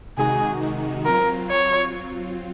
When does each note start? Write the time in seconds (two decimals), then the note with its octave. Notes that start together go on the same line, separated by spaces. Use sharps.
0.18 C3 D#3 G#3 D#4 F#4 G#4
0.62 C3 D#3 G#3 D#4 F#4
1.06 F#3 C4 F4 A#4
1.50 F#3 C4 F4 C#5